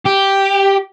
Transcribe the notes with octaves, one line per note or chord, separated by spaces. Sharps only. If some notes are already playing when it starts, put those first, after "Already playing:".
G4